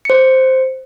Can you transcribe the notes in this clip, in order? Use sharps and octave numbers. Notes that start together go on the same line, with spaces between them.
C5 C#7